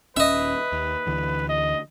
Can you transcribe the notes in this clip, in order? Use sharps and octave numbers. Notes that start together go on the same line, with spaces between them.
D#1 C#4 B4 D#5 E5
D#2
D2 D3 E3
D#5